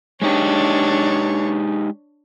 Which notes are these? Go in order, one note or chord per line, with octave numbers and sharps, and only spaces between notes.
G#3 D4 D#4 G4 C#5